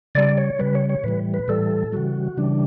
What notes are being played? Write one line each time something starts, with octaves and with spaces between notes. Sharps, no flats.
C#3 G3 D5
C#5
C#3 G3 B4
C#5
C#5
A2 E3 G3 B4
B4
A2 E3 G3 A4
C#3 E3 G3 F#4
C#3 E3 G3 D4